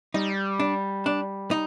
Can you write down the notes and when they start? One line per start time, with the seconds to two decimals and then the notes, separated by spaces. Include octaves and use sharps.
0.14 G3 D#4
0.60 D4
1.06 D4
1.51 D#4